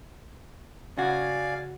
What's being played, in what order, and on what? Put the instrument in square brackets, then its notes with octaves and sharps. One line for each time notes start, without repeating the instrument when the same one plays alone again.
[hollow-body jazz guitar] C#3 F#4 [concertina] D5 F5 G#5